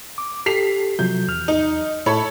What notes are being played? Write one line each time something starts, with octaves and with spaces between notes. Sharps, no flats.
D6
G4 A4 B6 C7 F7
C3 F3 F#3 G6
E2 F6
D#4
A2 E4 A4 C#5 B5